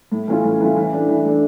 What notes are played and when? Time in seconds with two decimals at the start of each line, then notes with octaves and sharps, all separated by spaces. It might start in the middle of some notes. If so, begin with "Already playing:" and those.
0.12 A2
0.28 E3 A3 C#4 F4
0.44 A2
0.60 E3 A3 C#4 F4
0.76 E3
0.93 A3 D4
1.09 E3
1.25 A3 D4